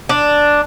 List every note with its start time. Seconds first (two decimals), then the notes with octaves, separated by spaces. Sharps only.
0.09 D4